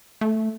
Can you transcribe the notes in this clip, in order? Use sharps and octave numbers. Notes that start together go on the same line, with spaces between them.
A3